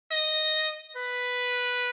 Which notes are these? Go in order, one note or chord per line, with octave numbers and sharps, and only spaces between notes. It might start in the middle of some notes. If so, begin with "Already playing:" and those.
D#5
B4